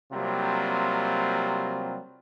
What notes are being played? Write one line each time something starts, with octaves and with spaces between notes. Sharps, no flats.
C3 F#3 G3 A#3 C4 F4